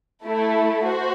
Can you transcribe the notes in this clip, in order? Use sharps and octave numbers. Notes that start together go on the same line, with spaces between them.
A3 E4 A4
F#4 C5